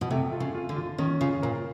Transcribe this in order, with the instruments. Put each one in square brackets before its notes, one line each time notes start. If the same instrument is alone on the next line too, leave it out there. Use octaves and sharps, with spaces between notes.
[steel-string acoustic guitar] B2
[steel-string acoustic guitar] C3 [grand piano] A3
[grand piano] F4
[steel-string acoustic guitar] C#3
[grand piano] F4
[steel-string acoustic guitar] D3
[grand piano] F4
[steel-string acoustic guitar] D#3 [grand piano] C#4
[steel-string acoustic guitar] C#3 [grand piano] F4
[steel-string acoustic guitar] A#2 [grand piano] A#4